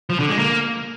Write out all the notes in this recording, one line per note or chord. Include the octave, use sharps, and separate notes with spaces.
F3
D3
G#3
A#3